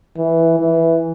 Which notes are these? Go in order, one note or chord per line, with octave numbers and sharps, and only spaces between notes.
E3
E3